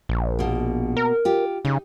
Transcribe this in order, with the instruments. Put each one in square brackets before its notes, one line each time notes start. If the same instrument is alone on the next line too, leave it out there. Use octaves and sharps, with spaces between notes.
[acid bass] A#1
[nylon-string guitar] B2 A#3
[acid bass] A#4
[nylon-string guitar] F4 G4
[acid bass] C#3 [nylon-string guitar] D#4